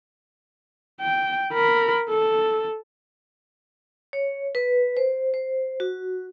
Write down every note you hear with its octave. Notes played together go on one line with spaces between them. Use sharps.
G5
A#4 B5
A4
C#5
B4
C5
C5
F#4